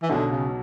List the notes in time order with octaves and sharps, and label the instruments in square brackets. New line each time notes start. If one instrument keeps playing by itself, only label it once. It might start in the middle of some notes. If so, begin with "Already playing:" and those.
[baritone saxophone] E3
[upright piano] B1 B2 F#3 [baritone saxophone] D3
[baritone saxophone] C#3